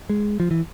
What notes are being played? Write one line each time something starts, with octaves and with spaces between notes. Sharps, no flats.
G#3
F3
E3